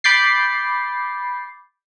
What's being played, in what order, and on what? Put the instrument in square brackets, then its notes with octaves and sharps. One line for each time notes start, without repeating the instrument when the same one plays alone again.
[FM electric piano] B5 D6 G6 A6 C7